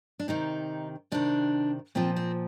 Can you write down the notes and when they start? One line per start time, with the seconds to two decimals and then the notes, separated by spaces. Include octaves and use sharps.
0.19 D4
0.28 C3 D#3 D#4
1.12 C3 D#3 D4
1.95 A#2 F3 C4
2.16 C4